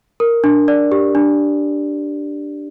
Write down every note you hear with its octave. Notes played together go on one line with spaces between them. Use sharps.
A#4
D4
D5
G4
D4